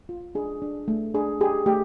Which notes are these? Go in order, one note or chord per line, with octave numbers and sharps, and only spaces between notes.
F4
D4 G#4
D4
A3
D4 G#4
G4 G#4
A3 G4